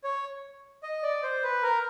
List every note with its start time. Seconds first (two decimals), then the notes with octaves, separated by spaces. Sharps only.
0.04 C#5
0.83 D#5
1.03 D5
1.23 C5
1.43 B4
1.63 A#4